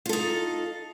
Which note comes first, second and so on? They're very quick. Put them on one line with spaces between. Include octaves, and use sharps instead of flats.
F4 A4 D#4